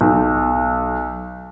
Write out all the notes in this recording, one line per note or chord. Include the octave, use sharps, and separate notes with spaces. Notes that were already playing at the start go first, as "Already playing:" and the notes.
B1